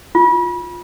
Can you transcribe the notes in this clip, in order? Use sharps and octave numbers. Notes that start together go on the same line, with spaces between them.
F4